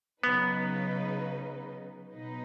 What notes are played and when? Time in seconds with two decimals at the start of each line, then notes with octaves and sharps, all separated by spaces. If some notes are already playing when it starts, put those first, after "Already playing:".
0.23 C#3 F#3 B3 D#4 B4
2.13 B2 F#3 D#4 B4